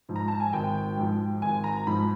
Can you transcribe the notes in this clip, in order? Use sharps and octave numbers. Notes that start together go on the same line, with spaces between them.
G#2 F3
A#5
A5
G#5
G#1 G5
G#2 F3
G#1 G#5
A#5
G#2 F3 B5